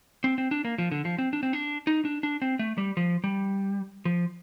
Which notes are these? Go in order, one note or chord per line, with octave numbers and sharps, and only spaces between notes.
C4
C4
D4
A#3
F3
D3
F3
C4
D4
C4
D4
D#4
D4
D4
C4
A3
G3
F3
G3
F3